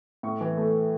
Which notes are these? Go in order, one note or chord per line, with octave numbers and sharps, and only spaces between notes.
A2 C#6
E3
A3